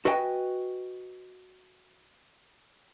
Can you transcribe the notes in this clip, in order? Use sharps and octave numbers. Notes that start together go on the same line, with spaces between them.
F#4 B4 D#5 E5 G5 G#5